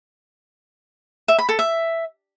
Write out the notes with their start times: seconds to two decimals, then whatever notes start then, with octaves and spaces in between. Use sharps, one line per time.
1.28 E5
1.38 B5
1.49 A4
1.59 E5